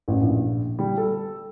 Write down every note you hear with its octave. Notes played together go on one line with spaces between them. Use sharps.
A1
A#1
G3
A4